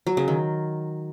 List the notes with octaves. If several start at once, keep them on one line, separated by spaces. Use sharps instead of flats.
F#3
C#3
D#3